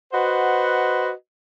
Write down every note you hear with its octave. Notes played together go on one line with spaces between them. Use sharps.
F#4 B4 C5 D#5 F#5